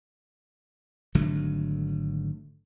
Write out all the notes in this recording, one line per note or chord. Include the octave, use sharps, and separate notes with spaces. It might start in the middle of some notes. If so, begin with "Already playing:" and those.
G#1 D3 F#3 A3